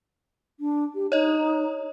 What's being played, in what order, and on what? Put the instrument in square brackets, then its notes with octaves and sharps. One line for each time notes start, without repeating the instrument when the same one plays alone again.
[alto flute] D4
G4
[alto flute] D#4 [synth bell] C#5 D#5